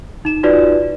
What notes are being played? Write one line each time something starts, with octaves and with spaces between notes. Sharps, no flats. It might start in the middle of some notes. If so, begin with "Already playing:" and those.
D#4 E7
D#4 F4 F#4 B4 D5